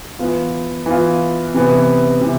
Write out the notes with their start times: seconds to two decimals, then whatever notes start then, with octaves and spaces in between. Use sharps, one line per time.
0.19 E3 B3 F4
0.86 E3 B3 F4
1.54 C3 E3 B3
2.21 C3 E3